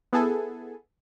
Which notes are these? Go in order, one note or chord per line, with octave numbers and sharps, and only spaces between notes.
B3 E4 G#4 A4 G#5